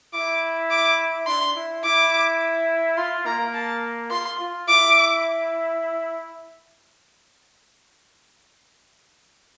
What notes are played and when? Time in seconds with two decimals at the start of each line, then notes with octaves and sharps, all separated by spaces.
0.14 E4 D6
0.71 D6
1.27 D4 C6
1.56 E4
1.84 E4 D6
2.97 F4 C6
3.26 A#3 A#5
3.54 A5
4.11 F4 C6
4.40 F4
4.68 E4 D6